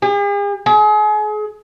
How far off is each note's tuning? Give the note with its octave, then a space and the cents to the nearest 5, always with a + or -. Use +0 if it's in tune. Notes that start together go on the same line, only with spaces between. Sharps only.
G#4 -45
G#4 +35